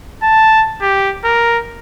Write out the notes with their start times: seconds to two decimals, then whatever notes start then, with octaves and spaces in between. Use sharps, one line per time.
0.23 A5
0.81 G4
1.24 A#4